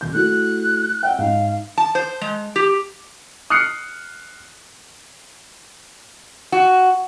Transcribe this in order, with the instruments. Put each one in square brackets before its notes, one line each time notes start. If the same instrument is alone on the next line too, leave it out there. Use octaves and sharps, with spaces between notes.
[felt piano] D#1 G6
[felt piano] A3 E4 F#4 [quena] F#6
[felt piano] E5 F#5 [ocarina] G5
[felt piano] G#2 D#4 [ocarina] F5
[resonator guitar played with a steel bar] A5
C5
G#3
G4
[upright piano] D#6 F6 F#6 C7 C#7
[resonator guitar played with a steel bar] F#4